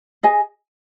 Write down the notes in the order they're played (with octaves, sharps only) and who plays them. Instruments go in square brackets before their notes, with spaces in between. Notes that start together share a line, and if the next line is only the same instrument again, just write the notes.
[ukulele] G#4 D#5 G#5